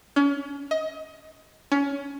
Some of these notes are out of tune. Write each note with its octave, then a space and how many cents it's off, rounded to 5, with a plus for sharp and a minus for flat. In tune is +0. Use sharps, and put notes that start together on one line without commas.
C#4 +35
D#5 +25
C#4 +25